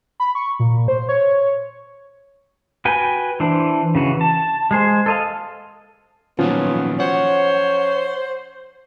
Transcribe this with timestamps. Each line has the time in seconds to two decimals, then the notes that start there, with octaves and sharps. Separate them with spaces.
0.20 B5
0.35 C#6
0.60 A#2
0.88 C5
1.09 C#5
2.85 F#4 B4 G5 G#5
3.40 E3 D4 C5
3.95 C#3 E3 F#4
4.21 A5
4.71 G#3 G#4 C5
5.06 A4 D#5 F5
6.39 A#2 D#3 F3 F#3 B3 C#4 F4
7.00 C5 C#5 F#5